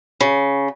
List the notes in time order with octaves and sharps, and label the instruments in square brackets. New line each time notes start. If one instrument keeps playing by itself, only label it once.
[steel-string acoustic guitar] C#3